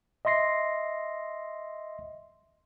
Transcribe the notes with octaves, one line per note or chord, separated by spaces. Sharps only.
D#5 E5 C6 A#6 C7